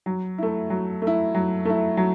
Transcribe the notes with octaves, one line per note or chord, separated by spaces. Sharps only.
F#3
A3 E4
F#3
A3
E4
F#3
A3 E4
F#3